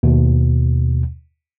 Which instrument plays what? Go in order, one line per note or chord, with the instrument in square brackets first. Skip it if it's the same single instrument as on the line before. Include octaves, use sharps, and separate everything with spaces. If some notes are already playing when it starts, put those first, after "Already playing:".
[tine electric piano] D#2 B2